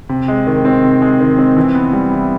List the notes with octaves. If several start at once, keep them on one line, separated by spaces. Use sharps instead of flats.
C3
G#3
D#3
C4
C3
G#3
D#3
C4
E3
B3
G3
E4